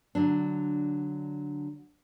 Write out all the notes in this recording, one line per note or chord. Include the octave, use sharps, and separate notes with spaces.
D3 F#3 D4